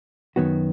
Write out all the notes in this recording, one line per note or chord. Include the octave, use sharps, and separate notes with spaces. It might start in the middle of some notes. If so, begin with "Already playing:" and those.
F#2 D#3 F#3 B3 F#4